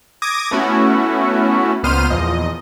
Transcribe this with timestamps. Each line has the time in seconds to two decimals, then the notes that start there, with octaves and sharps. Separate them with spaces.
0.22 D6 D#6 G#6 A#6
0.51 A3 B3 C#4 E4 F#4
1.83 C#2 A#2 B3 C5 F6 D#7
2.10 E2 A#2 F3 D#5